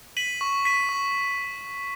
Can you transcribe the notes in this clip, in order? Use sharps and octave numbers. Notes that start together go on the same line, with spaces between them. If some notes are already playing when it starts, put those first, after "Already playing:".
B6 D#7 F#7
C#6
B6 D#7
C#6